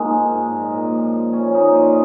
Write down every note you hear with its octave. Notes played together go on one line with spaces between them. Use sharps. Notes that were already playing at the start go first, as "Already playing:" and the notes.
Already playing: F3 G#3 A#3 D#4
G#2
G#2
A#2
A#2
F3
F3
A#2 C#4
A#2 D#4
G#2 F4